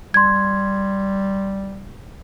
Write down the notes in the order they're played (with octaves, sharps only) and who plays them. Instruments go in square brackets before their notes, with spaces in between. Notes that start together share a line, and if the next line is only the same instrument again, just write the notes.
[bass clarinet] G3 [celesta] C6 G#6